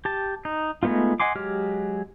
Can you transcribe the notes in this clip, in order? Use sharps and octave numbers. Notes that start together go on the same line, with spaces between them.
G4 A5
D#4
G#3 A3 B3 D#4 F4
D#5 F#5 G#5 C6 D6
F#3 G#3 G4 F6